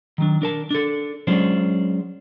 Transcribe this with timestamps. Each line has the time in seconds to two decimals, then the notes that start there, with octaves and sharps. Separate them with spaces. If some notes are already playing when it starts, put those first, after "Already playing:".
0.18 D#3 F#3 D4
0.42 D4 A#4 A5
0.71 D4 A4
1.27 F#3 G#3 C#4 D4 F4 C5